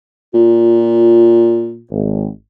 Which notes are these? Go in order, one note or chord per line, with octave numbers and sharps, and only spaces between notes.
A#2 F4
G#1